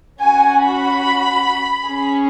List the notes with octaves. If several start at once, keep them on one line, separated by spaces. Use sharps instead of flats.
C#4 F#4 G#5
B5
C#4 G#4